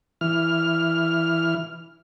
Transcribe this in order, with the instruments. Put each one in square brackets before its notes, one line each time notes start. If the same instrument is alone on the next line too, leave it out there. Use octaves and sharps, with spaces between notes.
[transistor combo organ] E3 F6